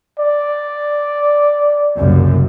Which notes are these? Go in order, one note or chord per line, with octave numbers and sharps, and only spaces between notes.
D5
F#1 C2 F#2